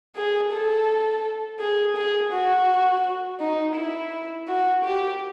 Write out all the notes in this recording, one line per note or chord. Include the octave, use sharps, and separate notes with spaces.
G#4
A4
G#4
G#4
F#4
D#4
E4
F#4
G4